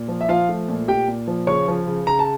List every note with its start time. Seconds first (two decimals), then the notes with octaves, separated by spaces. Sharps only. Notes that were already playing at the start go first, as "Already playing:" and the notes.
Already playing: A#2
0.08 F3
0.21 E5
0.29 F3 F4 F5
0.49 A3
0.68 A#2
0.88 A#2 G4 G5
1.08 A#2
1.27 F3
1.47 C#3 C#5 C#6
1.68 F3
1.87 C#3
2.07 C#3 A#5
2.19 A5